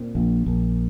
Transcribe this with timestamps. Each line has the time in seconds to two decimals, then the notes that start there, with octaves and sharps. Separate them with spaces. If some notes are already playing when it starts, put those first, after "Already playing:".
Already playing: A#2 C4
0.15 A#1
0.46 A#1